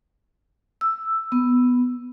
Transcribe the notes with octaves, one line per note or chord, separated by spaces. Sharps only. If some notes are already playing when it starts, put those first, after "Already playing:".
E6
B3